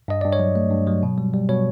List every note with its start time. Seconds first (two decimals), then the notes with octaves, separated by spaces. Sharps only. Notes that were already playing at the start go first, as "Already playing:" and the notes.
0.08 G2 D#5
0.21 G2 D5
0.33 C#5
0.40 F#3
0.56 A3
0.71 G2
0.87 F#3
1.03 B2
1.18 G3
1.34 G3
1.49 B2 C#5